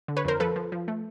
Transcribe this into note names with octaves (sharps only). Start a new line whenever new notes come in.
D3
B4 C#5
F2 A#4 C5
F3 A4 B4
F3
F3
A3